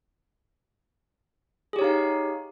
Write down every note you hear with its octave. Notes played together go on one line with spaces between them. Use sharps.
D#4 G4 G#4 C#5 F5